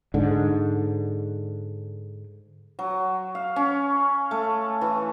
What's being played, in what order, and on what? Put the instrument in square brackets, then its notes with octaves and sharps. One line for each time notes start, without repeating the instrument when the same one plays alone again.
[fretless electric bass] G#2 D3
[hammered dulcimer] F#3
F5
C#4
A3
E3